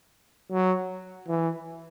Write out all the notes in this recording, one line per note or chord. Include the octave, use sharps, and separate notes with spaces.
F#3
E3